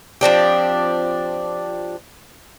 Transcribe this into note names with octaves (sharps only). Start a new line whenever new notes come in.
F3 C4 D4 G4